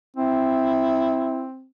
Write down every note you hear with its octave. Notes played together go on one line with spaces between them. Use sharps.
C4 E4